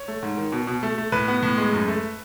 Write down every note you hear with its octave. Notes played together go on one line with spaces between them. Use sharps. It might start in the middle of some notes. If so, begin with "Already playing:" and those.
Already playing: C#5
A3
G#2
D#3
B2
B2
A3
A3
A2 B4
B3
A2
G#3
F#2
A3